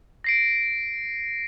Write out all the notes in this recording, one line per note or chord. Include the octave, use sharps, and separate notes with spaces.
A#6 C7 D7